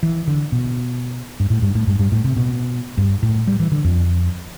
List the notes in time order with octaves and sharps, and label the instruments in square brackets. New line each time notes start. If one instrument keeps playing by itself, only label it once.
[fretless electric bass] E3
D3
B2
G2
A2
G2
A2
G2
G2
A2
C3
B2
G2
A2
G3
E3
D3
F2